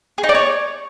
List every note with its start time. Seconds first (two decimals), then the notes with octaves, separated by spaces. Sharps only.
0.18 G#4
0.23 D#4
0.29 D5
0.34 C#5